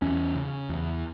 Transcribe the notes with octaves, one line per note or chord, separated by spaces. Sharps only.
E2 C#4
C#3
E2